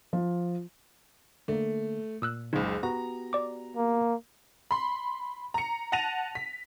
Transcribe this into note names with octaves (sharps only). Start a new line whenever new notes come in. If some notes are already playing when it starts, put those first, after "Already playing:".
F3
D3 A3 A#3
A#2 D#6 E6 F#6
F#1 C#2 D#4
B3 F#4 G4 A#5
D5 D6
A#3
B5 C6
A#5 C#7
F#5 A5 A#6 D#7 F7
B6